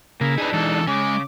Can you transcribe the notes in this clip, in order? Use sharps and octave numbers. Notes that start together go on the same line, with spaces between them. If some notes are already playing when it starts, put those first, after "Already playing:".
C#3 A#3 E4
D4 D#4 G#4 B4
E3 G#3 A4
C#3 G#3 G#5 D6